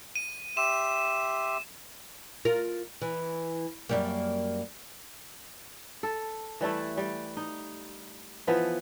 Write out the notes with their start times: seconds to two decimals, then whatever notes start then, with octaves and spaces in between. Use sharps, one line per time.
0.16 D#7
0.57 G4 E5 C6 E7
2.45 F4 A#4
3.02 E3
3.89 F#2 G3 A#3
6.03 A4
6.61 E3 G3 A3 E4
6.97 G3
7.37 D#4
8.47 E3 F3 B3